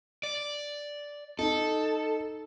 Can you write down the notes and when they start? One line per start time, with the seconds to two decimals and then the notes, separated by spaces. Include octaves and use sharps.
0.23 D5
1.39 D#4 A4